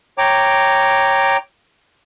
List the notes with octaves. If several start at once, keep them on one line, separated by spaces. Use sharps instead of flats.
C#5 G5 A#5 D6